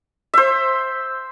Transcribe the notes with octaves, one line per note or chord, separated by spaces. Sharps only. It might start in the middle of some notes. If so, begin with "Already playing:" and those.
C5 E5